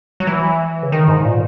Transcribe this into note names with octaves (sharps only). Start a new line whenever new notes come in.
F#3
E3
C#3
D#3
G#2
A#2